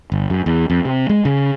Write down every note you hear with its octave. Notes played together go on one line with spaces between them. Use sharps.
G1
F#2
E2
F2
C3
G#3
C#3